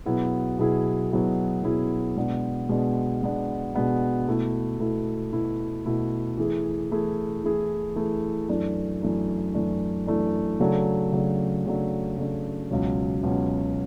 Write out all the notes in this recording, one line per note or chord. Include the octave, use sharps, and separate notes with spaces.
B2 F#3 B3 E4 G#4
B2 F#3 B3 E4 G#4
B2 F#3 B3 E4 G#4
B2 F#3 B3 E4 G#4
B2 G#3 B3 D4
B2 G#3 B3 D4
B2 G#3 B3 D4
B2 G#3 B3 D4
B2 A3 E4
B2 A3 E4
B2 A3 E4
B2 A3 E4
E3 A3 E4 G#4
E3 A3 E4 G#4
E3 A3 E4 G#4
E3 A3 E4 G#4
F#2 E3 A3 D4
F#2 E3 A3 D4
F#2 E3 A3 D4
F#2 E3 A3 D4
C#3 F#3 A3 D4
C#3 F#3 A3 D4
C#3 F#3 A3 D4
C#3 F#3 A3 D4
C#2 B2 F#3 C#4
C#2 B2 F#3 C#4